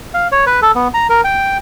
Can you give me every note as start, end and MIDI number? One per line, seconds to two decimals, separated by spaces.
0.14 0.28 77
0.32 0.45 73
0.46 0.60 71
0.62 0.72 69
0.75 0.88 59
0.94 1.07 82
1.10 1.21 70
1.24 1.58 79